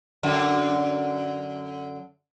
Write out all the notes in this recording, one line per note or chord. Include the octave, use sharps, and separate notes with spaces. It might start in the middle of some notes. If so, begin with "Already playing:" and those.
F#2 D3